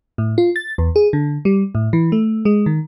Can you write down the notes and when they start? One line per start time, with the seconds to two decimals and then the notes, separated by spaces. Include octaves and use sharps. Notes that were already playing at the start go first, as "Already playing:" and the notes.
0.18 A2
0.38 F4
0.56 A6
0.78 E2
0.96 G#4
1.13 D3
1.45 G3
1.75 A2
1.93 E3
2.12 A3
2.45 G#3
2.66 D#3